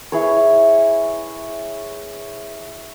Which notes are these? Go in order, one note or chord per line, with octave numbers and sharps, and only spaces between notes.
E4 G#4 B4 C#5